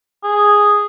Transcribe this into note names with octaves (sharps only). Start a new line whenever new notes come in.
G#4